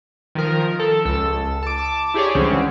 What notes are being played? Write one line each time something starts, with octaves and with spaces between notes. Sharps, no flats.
D#3 F3 A#4
A4
C#2 A4 E6
A5 D6
E4 G4 G#4 C#5 D5
C#2 D3 E3 G3 C4 C#4